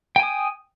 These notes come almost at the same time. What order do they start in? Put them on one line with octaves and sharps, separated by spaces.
G5 G#5 D#6